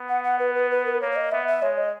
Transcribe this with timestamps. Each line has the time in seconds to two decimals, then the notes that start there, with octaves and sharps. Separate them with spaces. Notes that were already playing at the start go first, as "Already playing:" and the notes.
Already playing: B3
0.09 F#5
0.24 F#5
0.39 B4
0.55 B4
0.71 B4
0.86 A#4
0.95 B4
1.01 A#3 C#5
1.11 C#5
1.16 D#5
1.32 B3 E5
1.47 E5
1.62 G#3 C#5
1.78 D#5